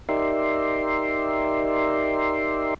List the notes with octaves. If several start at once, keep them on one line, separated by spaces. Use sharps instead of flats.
D#4 G4 A#4 D5 E5 C6